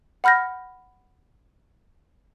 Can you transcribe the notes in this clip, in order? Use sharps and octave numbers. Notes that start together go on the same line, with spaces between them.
F#5 B5 F6 G6 A#6